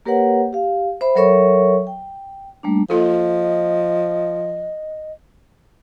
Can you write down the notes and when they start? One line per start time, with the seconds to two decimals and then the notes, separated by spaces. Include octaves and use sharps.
0.05 A#3 G4 A#4 B4 C#5 F#5
0.53 G4 F5
1.01 C5 E5 B5
1.15 F#3 A4 A#4 C#5 E5 C#6
1.87 G5
2.63 G3 A3 A#3 D4
2.90 F3 A#3 F4 A4 D#5